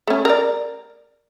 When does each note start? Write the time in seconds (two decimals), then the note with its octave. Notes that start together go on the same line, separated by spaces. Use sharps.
0.07 A3 C#4
0.25 A#4 D5